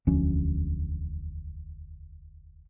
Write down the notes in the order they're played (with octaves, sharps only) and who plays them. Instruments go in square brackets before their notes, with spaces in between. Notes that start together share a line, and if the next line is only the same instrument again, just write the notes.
[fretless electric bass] E1 D2 F3 C#4